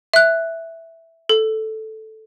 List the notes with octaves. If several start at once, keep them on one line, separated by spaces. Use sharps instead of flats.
E5 F#6
A4